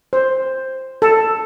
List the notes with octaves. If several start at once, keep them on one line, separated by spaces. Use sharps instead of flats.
C5
A4